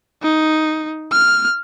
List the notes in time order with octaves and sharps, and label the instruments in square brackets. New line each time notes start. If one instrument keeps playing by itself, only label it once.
[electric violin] D#4
F6